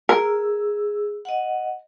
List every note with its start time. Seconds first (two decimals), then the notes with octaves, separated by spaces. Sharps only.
0.09 G#4 A#4 E6
1.25 D#5 F#5